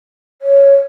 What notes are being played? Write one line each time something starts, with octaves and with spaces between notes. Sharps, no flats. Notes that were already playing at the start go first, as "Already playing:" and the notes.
C#5